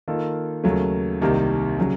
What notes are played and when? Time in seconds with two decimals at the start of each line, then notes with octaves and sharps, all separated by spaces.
0.08 D#3 A#3 F4 A4
0.64 D#2 C#3 F#3 A3
1.21 C2 C3 D#3 A#3
1.79 C#3 F#3